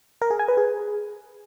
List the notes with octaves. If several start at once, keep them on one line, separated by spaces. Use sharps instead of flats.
A#4
G#4
G#5
B4
G#4